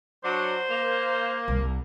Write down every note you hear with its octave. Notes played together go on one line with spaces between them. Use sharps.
F#3 D4 F#4 C5
A#3
C2